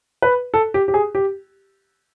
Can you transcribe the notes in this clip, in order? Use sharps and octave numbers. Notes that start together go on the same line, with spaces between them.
B4
A4
G4
G4
G#4
G4